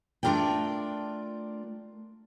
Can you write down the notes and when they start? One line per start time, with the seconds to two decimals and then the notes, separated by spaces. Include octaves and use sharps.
0.23 A3 D4 F4 A#4 D5 G5